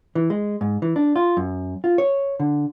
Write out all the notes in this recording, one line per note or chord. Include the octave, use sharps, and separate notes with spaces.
E3
G#3
G#2
E3
D4
F4
F#2
F4
C#5
D3